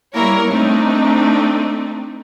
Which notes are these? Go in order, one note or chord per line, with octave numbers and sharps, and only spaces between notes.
G3 A#3 E4 A#4 C#5
A3 C4 D4 D#4